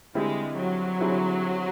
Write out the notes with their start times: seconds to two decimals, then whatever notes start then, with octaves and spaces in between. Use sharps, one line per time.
0.15 D3 G3 G#3 C4 E4 G#4
0.57 F#3
1.00 D3 G3 C4 E4 G#4